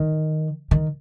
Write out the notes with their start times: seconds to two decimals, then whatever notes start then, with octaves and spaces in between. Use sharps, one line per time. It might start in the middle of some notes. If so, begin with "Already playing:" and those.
Already playing: D#3
0.71 D#3